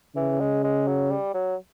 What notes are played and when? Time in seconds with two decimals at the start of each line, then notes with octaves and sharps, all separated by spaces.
0.16 C#3 E3
0.40 G#3
0.64 G#3
0.88 F#3
1.11 G3
1.34 F#3